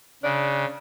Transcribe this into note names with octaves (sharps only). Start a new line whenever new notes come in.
C#3 D4